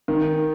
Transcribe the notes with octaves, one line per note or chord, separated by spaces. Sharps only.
D#3